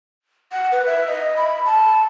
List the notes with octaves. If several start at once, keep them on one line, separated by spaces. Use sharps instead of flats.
F#5
B4
E5
D#5
B5
A5